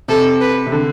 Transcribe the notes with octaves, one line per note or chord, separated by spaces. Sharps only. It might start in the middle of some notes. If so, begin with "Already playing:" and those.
C3 A4
B4
C3
D3